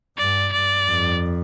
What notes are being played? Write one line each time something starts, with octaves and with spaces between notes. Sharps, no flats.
G2 D5
G2 D5
F2